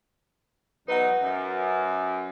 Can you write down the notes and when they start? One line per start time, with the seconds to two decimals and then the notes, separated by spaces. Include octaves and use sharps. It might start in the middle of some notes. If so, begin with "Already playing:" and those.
0.88 E2 F#3 D#4 B4 F#5
1.20 F#2